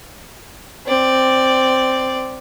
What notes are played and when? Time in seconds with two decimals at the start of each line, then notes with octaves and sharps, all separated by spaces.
0.86 C4 D5